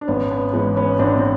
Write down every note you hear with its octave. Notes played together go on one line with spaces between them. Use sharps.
D4
G#1 B3 C#4
B3
G#2 E3 G#3 B3
B3 C#4
G#1 C4 D4
C4